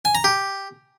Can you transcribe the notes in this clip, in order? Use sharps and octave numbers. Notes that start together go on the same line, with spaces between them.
G#5
A#5
G4